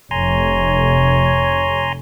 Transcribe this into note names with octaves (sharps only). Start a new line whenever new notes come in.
F1 C#5 G#5 A#5 C6